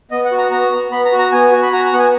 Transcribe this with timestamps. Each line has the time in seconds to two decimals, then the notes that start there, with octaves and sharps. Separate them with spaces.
0.11 B3 D#5
0.25 F#5
0.32 F#4
0.38 A#5
0.51 B3 A#5
0.72 B3
0.92 B3 B5
1.05 A#5
1.12 F#4
1.19 A#5
1.32 B3 G#5
1.52 F#4
1.62 B5
1.73 F#4 A#5
1.86 A#5
1.92 B3 F#5
1.99 G#5